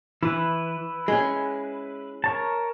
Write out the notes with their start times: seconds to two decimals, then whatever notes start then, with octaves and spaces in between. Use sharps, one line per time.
0.23 E3 E4 B4
1.08 G#3 C#4
2.24 A#4 C#5 A5